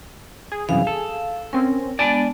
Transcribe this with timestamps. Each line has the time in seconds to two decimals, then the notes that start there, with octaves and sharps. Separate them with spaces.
0.52 G#4
0.69 C2 F#2 E3 F5
0.87 A4
1.53 C4 C#4 A#4
1.99 G#3 B3 D4 D5 G#5 A5